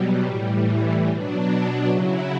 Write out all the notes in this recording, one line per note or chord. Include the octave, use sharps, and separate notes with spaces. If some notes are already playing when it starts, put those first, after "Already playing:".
Already playing: B2 F#3 G3
A2 E3
B2 F#3 D4
C#3 F#3 E4